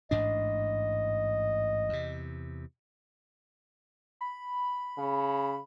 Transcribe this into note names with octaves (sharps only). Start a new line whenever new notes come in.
A1 G#2 D4 D#5
E2 C3
B5
C#3